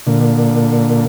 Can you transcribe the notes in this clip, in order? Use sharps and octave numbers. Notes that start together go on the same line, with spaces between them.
A#2 D3